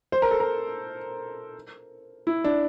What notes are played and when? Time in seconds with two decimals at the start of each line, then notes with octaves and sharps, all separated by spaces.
0.12 C5
0.22 A#4
0.31 A4
0.40 A#4
2.27 E4
2.44 D4